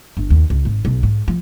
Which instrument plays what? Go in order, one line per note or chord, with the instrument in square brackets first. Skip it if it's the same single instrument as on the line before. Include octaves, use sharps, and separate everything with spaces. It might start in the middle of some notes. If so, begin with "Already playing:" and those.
[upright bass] G1
D#2
C#2
G#1
B1
G#2
F3